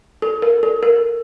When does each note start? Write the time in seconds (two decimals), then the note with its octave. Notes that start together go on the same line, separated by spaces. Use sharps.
0.22 A4
0.42 A#4
0.63 A4
0.83 A#4